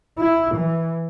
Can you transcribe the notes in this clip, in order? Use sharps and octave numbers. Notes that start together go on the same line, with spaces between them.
E4
E3